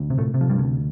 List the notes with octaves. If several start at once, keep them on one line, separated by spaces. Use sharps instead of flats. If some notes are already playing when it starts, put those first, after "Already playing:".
Already playing: D2
C3
A2 A3
C3
F3
G2 G3
D2